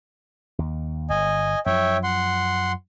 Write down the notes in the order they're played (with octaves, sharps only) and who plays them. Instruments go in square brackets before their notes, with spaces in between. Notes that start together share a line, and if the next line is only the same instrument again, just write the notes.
[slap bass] D#2
[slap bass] G1 [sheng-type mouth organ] D#5 G#5
[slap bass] F#2 F3 [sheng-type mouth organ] C#5 E5 G5
[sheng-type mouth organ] F#5 C6